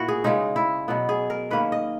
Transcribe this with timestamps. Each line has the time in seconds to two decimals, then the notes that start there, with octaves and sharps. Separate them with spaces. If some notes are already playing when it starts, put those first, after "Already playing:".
Already playing: A#2 E4 F#4
0.08 G#4
0.24 C#3 G#3 C#4 D#4
0.56 E4
0.88 B2 F#3 B3
1.09 G#4
1.30 A#4
1.50 D#3 A#3 C#4 B4
1.72 D#5